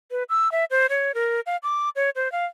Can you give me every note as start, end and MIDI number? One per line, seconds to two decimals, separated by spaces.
0.11 0.23 71
0.29 0.51 88
0.52 0.65 76
0.71 0.87 72
0.90 1.12 73
1.15 1.40 70
1.46 1.57 77
1.63 1.89 86
1.96 2.10 73
2.16 2.31 72
2.32 2.45 77